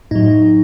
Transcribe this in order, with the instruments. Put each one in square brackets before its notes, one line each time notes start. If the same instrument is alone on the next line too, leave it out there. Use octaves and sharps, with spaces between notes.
[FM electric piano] A2 F#3 D#4